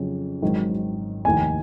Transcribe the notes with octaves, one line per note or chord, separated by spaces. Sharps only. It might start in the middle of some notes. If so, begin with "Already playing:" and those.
Already playing: F2 C#3 F#3
G#1 G#2 D#3 F#3
F1 D#2 D#3 G#5